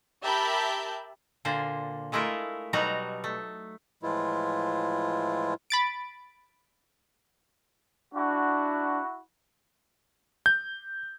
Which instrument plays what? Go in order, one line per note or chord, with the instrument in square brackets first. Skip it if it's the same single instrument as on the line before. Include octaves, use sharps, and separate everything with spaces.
[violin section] G4 A#4 E5 A5 B5 G6
[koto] A#2 D3 A#3 C5
G#3 A3 E4 F4 A#4
B2 F#3 G3 D#4 F#4 A#5
A3
[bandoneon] A2 E3 F3 G#3 E4 F4
[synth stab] B5 A6 D7
[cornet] D4 [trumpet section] E4 F#4
[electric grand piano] G6